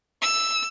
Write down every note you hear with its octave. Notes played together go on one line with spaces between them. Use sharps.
E6